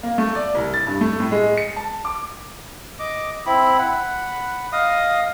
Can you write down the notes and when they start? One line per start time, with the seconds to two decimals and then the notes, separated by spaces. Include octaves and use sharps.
0.03 A#3
0.18 A3
0.35 D5
0.55 C2
0.74 A6
0.87 G2
1.01 A3
1.20 A2
1.31 G#3
1.58 C#7
1.76 A5
2.05 D6
2.99 D#5 D6
3.46 C4 E4 B5
3.79 F#5 B5
4.72 D#5 F5 D#6